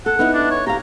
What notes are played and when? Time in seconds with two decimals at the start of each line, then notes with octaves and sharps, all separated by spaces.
0.06 A4 F#5
0.19 B3 D#4 E4
0.33 D4
0.51 C#5
0.67 G4 F5 A#5